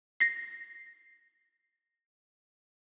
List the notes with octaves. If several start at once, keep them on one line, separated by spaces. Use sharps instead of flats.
A#6 C7